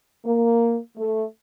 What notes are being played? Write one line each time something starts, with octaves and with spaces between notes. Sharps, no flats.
A#3
A3